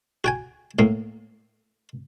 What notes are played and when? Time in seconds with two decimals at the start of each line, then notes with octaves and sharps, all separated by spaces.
0.24 F#4 G5 G#5
0.79 A2 A#3